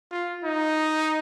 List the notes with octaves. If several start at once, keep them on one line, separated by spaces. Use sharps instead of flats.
F4
D#4